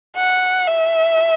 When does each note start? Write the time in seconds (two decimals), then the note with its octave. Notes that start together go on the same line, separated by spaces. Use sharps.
0.16 F#5
0.67 E5